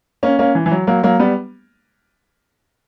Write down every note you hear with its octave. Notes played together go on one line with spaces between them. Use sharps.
A#3 C#4
A#3 C#4
E3
E3
F#3
F#3 A#3
F#3 A#3
G3 B3